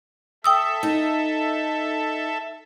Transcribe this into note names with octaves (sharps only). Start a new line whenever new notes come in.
A4 E5 G5 D#6 E6
D#4